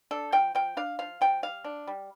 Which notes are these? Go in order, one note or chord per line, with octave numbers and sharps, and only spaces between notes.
D4 A4
F3 G5
F3 G5
D4 F5
F3 F5
F3 G5
G3 F5
D4
G3